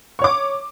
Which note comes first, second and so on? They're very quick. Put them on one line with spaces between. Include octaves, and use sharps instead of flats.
C#6 C#5 D6